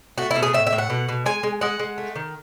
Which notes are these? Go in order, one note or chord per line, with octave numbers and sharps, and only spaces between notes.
A3 F#4
E4
B2
G#4
A2 E5
E5
A2
F#5
B2
B2
G#3 G#5
G#3
G#3 F#5
G#3
A3
D#3